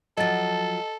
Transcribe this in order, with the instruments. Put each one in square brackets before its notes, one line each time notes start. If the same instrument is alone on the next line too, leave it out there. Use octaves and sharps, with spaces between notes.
[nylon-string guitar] F3 F#3 [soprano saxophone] A4 [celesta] D#5 A6